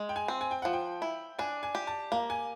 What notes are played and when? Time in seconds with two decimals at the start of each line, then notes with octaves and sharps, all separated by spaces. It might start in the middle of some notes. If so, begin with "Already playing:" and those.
Already playing: G#3
0.09 G5
0.16 G#5
0.28 C4
0.41 G#5
0.51 G5
0.62 F3 F#5
0.73 G5
1.02 E4
1.39 D4 G#5
1.63 G#5
1.75 G4
1.87 A5
2.12 A#3 A#5
2.30 G#5